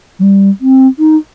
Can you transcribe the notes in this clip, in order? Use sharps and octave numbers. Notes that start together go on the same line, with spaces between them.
F#3
G3
C4
D#4